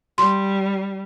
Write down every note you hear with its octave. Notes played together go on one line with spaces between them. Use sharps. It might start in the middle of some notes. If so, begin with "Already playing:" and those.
G3 C6